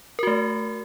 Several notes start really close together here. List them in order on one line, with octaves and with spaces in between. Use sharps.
A#4 F#4 A3